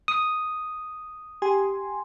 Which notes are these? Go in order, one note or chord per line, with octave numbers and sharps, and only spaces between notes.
D#6
G4 G#5 C6